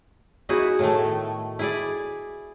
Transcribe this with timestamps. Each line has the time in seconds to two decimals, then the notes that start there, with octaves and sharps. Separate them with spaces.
0.49 B3 D#4 E4 F#4 G#4
0.79 A2 D#3 A3
1.59 E4 G#4 D5